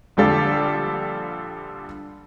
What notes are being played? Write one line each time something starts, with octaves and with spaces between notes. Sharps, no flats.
A#1 D3 G3 A4 F5 D6